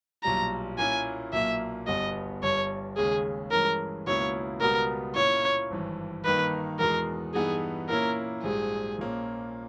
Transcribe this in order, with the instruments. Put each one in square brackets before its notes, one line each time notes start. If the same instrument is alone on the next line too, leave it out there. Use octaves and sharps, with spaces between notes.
[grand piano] B1 A#2 G3 [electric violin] A#5
[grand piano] A#2 A#3 C#4 E4 [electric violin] G#5
[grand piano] B1 A#2 A#3 [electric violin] E5
[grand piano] G1 G2 G3 B3 [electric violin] D#5
[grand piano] G1 G2 G3 [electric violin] C#5
[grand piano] D#2 C#3 G#3 C#4 [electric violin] G#4
[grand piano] G2 E3 G#3 C#4 [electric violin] A#4
[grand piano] C#2 B2 A#3 C#4 E4 [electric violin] C#5
[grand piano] C#2 B2 G3 B3 [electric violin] A#4
[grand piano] A#2 A#3 C#4 E4 [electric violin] C#5
[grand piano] G#1 G2 E3
[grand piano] G2 D#3 A#3 D#4 [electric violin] B4
[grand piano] E2 B2 G#3 [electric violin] A#4
[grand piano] G2 E3 G3 B3 D#4 [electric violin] G#4
[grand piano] A#2 A#3 C#4 E4 [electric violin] A#4
[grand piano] A#1 G#2 G3 [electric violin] G#4
[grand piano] A#1 A#2 A#3 C#4